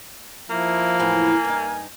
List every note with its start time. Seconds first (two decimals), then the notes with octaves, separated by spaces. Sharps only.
0.50 F3 A#3 E4
0.99 E2 A2 E3 G#5
1.44 G2 D#4